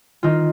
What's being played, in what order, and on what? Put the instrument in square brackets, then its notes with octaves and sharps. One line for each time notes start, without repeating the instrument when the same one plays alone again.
[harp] D#3 D#4 F4